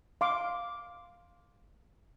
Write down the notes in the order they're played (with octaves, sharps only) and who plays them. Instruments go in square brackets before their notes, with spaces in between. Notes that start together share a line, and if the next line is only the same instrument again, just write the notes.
[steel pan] F5 C6 D6